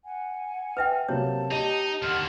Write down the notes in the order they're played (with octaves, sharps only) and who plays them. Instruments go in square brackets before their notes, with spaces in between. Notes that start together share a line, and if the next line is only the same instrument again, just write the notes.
[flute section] F#5 G#5
[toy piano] B4 E5 G5 [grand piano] F6
[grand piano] C3 F#3 A#3 [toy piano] C#5 [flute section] A5
[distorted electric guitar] D#4 [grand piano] G4 D#5 G5
[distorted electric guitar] D#2 D3 [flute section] F#5 C6 F6